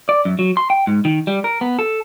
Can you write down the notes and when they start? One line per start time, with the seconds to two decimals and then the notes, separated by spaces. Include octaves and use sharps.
0.09 D5
0.25 F#2
0.39 F#3
0.57 C6
0.70 G5
0.87 G#2
1.05 D#3
1.27 G3
1.44 A#4
1.61 B3
1.79 A4